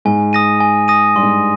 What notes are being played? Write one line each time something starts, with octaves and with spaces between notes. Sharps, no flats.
G#2 G#5
D#6 A#6 D#7
G#5
D#6 A#6 D#7
G2 C6
G#2